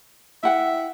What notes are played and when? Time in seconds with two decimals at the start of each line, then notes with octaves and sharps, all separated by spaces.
0.43 E4 E5 F#5 G5